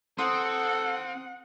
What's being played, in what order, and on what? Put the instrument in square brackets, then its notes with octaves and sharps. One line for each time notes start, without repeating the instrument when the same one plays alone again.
[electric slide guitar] C4 [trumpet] A4 [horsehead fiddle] F#5 [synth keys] C6 D#6